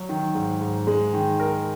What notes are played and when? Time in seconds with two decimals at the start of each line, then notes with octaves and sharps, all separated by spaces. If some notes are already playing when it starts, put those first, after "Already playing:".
Already playing: F#3
0.09 D#3
0.35 G#2
0.61 G#2
0.87 G#3
1.13 D#3
1.40 A#4